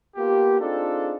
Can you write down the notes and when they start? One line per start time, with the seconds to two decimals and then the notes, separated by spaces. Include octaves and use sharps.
0.16 A#3 B3 F4 G4
0.59 C4 D4 D#4 F4 G#4 A4